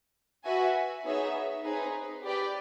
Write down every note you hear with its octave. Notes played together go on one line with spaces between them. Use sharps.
F#4 B4 E5 G#5
B3 D#4 G#4 C#5 E5
C4 D#4 G#4 B4
G4 B4 D5 G5